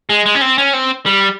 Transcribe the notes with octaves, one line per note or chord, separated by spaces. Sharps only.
G#3
G#3
C#4
C4
C#4
C4
G3